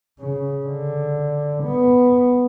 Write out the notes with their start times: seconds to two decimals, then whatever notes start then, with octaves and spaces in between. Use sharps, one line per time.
0.19 C#3
0.66 D3
1.64 B3